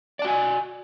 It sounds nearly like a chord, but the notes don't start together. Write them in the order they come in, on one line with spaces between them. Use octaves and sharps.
D5 A5 F#4 G#5